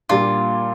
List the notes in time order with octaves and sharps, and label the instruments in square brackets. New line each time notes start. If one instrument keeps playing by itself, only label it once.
[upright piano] A#2 G3 A#3 D4 [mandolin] F4